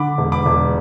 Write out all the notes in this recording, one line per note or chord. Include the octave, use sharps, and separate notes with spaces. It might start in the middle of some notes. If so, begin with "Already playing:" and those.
Already playing: D3 B5 D6
E1
B5 D6
E1